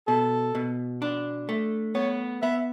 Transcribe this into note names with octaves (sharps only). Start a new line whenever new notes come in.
B2 A4
B2
D4
A3
B3 C#5
B3 E5